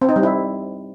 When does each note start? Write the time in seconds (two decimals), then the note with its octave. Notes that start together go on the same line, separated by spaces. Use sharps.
0.01 C4
0.09 D#4
0.16 G3
0.23 E4